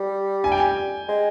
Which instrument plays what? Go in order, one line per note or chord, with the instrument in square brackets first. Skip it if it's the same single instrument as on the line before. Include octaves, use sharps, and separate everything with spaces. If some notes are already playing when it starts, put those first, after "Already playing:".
Already playing: [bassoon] G3
[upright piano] G#5
G5
G#5
[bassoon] G#3